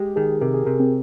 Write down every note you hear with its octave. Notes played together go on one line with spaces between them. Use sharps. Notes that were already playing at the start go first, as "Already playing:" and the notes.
Already playing: G#3 G4
D#3 G#4
C3 A#4
G#4
C3 A#4
C4